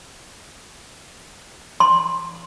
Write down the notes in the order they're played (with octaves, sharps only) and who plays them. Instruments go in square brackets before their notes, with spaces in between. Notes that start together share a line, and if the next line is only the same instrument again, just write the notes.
[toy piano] C6